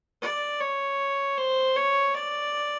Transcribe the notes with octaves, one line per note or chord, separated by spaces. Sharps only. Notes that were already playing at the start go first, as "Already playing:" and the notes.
D5
C#5
C5
C#5
D5